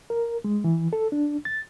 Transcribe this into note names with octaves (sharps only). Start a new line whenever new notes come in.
A#4
G#3
E3
A4
D4
A6